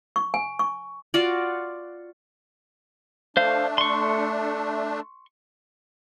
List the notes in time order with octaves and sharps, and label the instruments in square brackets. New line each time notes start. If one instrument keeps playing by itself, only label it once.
[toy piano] C#6
G#5
C#6
[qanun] F4 F#4 D5
[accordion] A3 D4 [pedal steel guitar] C5 F5
[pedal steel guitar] C6 C#6